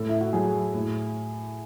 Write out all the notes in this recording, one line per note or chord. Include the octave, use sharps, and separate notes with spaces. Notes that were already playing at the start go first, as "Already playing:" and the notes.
Already playing: A2 A4
E4
F#4
F#3 G#4
A2